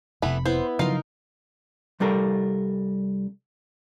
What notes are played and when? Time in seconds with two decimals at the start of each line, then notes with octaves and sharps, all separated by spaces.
0.22 F1 C3 E3 A3 B3 B5
0.46 B3 E4 C5
0.79 C#3 F3 F#3 D#4 F4 A#4 F5
2.00 C2 G3 A4 A#4